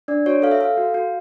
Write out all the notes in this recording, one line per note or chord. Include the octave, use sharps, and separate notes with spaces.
D4 D5
F#4 C#5
A4 F5
E5
A4 F5
F#4
F#4